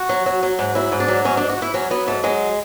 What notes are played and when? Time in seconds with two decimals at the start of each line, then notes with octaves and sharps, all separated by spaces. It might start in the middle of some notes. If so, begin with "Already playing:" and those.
Already playing: F#4
0.09 F#3
0.26 F#3
0.43 F#3
0.59 G#2
0.75 F#3 E4
0.92 G#2
1.00 D4
1.08 F#3
1.25 G#2 C#4
1.37 D4
1.41 G#2
1.49 F#4
1.58 G#2 E4
1.74 F#3 C#4
1.90 F#3 B3
2.07 G#2 A3
2.23 F#3 G#3